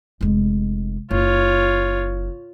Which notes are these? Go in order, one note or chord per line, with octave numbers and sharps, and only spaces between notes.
F1 G#3
F#1 F4 C#5